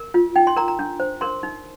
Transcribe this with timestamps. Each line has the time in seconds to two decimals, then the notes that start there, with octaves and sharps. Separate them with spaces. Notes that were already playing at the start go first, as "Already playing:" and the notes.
Already playing: A#4
0.14 F4
0.36 D#4 G5
0.47 C6
0.56 A#4 A#5
0.68 A#5
0.79 D4
1.00 C5
1.21 A#4 C6
1.43 D#4